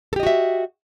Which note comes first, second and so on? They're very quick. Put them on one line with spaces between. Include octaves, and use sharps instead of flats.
A4 G4 D#5 F#4 E5